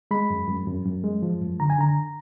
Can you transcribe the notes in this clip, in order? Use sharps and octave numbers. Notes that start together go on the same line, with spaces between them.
G#3 B5
F#2
F#2
F#2
F#2
G#3
F3
F#2
D3 A#5
G#5
D3 A#5